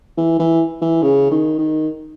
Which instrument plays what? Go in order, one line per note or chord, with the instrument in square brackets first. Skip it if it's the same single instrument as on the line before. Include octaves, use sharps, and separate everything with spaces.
[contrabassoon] E3
E3
E3
C#3
D#3
D#3